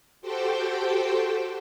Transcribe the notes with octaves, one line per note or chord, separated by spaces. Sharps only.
F#4 G4 A4 C5 G5